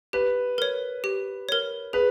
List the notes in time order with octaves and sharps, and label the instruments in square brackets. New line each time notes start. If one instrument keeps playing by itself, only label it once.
[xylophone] G4 [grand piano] B4
[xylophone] A#4 C#5
G4
A#4 C#5
[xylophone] G#4 [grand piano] B4